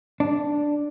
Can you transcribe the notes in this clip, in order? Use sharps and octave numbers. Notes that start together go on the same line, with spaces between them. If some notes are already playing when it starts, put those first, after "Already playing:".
D4